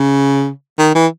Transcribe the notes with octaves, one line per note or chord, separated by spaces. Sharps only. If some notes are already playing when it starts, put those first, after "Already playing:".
Already playing: C#3
D#3
E3